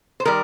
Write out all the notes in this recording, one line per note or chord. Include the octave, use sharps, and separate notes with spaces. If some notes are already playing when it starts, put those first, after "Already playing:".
C5
D#3 G3 A#4